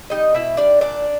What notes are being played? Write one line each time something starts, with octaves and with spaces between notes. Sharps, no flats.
G3 D#4 D#5
B2 E4 E5
G3 D4 D5
A#2 D4 D5